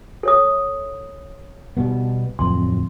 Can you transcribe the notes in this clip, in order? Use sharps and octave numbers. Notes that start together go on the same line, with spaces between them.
A4 C#5 D#6
B2 G3 B3
D1 F2 C6